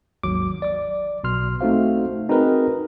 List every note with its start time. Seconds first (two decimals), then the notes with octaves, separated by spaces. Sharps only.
0.23 G#1 D#2 F#3 D6
0.62 D5 D6
1.24 B1 B2 C6 F6
1.61 A3 C4 D#4 F#4 C5 F5
2.29 C4 D#4 F#4 G#4 A#4 B4